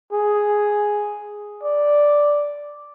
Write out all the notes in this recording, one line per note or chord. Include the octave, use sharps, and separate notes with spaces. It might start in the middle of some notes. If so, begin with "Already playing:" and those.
G#4
D5